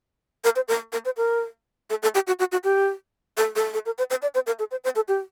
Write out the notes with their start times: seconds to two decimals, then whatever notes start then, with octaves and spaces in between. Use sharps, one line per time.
0.44 A#4
0.56 C5
0.68 A#4
0.93 A#4
1.05 C5
1.17 A#4
1.90 A4
2.03 A4
2.15 G4
2.27 F#4
2.39 F#4
2.52 F#4
2.64 G4
3.37 A4
3.56 A4
3.74 A4
3.86 A#4
3.98 C5
4.10 C5
4.22 D5
4.35 C5
4.47 A#4
4.59 A4
4.71 C5
4.84 C5
4.96 A4
5.08 G4